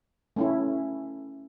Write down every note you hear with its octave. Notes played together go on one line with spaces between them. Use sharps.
A3 C#4 E4